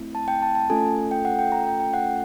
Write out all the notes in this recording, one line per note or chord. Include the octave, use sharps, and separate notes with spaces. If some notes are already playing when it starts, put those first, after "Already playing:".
Already playing: A3 C4 E4
A5
G5
A5
A5
A3 C#4 F4 A4 G#5
G5
F#5
G5
A#5
G5
G5
F#5